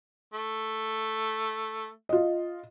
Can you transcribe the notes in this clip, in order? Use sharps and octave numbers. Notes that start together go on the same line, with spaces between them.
A3
F4 D#5